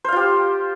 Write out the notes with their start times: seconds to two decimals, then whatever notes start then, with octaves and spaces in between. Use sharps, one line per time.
0.04 C5
0.08 F5
0.12 F4
0.16 G4